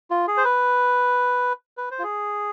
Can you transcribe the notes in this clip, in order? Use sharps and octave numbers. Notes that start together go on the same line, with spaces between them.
F4
G#4
C5
B4
B4
C5
F4
G#4